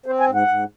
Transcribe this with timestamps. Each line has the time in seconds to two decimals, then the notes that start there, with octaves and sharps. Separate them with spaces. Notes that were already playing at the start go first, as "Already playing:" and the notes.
0.06 C4 C5
0.20 G#5
0.27 G#2
0.35 F#5
0.48 G#2